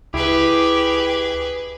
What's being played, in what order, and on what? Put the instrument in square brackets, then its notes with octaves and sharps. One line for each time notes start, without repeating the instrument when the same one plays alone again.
[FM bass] C#2 [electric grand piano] E4 [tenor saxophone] G4 [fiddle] G#4 B4